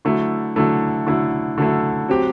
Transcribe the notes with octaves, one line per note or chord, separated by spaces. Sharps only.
D3 F#3 A3 E4
D3 F#3 A3 E4
D3 F#3 A3 E4
D3 F#3 A3 E4
F#3 C4 G4